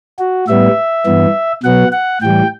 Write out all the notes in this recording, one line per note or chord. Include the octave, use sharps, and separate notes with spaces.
F#4
A2 G3 B3 E5
G2 E3 B3
B2 F#3 B3 F#5
F#5
A2 E3 G3 G5